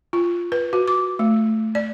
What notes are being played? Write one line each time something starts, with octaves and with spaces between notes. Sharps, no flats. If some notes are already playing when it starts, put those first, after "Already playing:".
F4
B4
F#4
D6
A3
D5